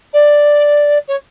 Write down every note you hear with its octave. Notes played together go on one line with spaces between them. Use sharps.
D5
C#5